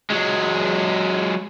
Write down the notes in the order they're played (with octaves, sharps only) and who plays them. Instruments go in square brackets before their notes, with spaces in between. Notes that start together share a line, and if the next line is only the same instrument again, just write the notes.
[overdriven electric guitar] F#3 G#3